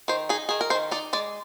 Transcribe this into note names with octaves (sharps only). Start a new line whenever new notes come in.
D#3 C5
D#4 G#4
D#3 G#4
A#4
D#3 C5
D#4 D5
G#3 D5